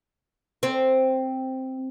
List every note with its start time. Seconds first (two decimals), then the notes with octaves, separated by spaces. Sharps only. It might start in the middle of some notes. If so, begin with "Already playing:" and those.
0.63 C4